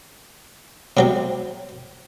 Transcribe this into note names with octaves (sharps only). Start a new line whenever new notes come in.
C3 F#3 C4